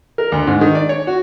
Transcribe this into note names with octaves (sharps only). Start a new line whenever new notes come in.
A#4
D2
G#2
D#3
D5
C#5
F#4